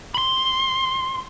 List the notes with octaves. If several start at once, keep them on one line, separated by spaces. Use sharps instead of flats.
B5 C6